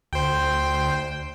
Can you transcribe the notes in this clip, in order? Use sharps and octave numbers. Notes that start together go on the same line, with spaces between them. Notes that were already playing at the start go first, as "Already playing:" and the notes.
D2 C5 G5